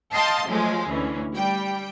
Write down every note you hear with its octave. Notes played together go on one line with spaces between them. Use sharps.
D#5 F5 G5 A5 C6
F3 F#3 G#3 A3
D2 E3 C#4
G3 G5